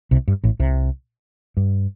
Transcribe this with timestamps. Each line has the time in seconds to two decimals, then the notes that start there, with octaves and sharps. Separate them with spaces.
0.11 C2 C3
0.28 G2
0.44 A1 A2
0.59 C2 C3
1.57 G2